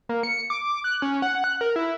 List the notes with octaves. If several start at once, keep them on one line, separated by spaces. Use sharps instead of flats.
A#3
C#7
D6
F#6
C#4
F#5
F#6
A#4
E4